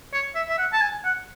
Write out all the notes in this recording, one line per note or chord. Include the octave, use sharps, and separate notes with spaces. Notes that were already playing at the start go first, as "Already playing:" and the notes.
C#5
E5
E5
F#5
A5
G#5
F#5